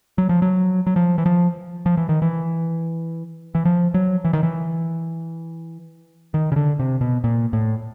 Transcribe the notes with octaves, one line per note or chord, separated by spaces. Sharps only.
F#3
F3
F#3
F#3
F3
E3
F3
F3
E3
D#3
E3
E3
F3
F#3
E3
D#3
E3
D#3
C#3
D3
C3
B2
A#2
A2